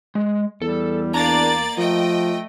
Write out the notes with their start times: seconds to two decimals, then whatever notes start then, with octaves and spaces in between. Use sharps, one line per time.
0.15 G#3
0.62 E2 G3 A4
1.14 A#3 D4 D5 A#5 A6
1.78 F3 A3 D#5 G5